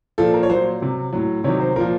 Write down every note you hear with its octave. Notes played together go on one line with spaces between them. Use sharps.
A#2 F3 A4
A#4
C#5
A#2 F#3 C5
C3 F#3
A2 F#3
C3 D#3 F#3 C#5
C5
A#2 F3 A#4